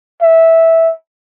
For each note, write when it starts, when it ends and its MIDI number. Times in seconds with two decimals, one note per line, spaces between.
0.22 0.92 76